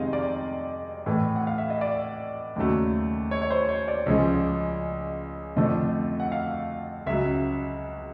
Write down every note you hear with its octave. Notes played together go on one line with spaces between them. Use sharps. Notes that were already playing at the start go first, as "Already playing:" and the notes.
Already playing: F2 C3 D#3 G#3 C4 D#5 F5
D5
A2 E3 A3
F#5
F5
E5
D#5
D5
D#2 C#3 F#3 A3
C#5
C#5
C5
C#5
D5
C#2 C#3 F3 G#3 C#4
F2 D3 F3 A3 D4 D#5
F#5
F5
C#2 C#3 F#3 E5